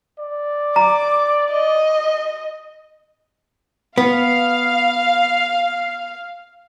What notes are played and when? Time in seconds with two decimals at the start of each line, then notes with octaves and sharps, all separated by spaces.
0.19 D5
0.76 A#5 D6
1.52 D#5
3.98 B3 F5